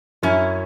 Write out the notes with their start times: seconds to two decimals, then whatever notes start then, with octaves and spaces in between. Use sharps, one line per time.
0.23 F#2 C#4 E4